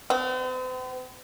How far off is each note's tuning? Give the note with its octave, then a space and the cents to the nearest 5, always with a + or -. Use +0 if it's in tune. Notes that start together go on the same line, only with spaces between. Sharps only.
C4 -45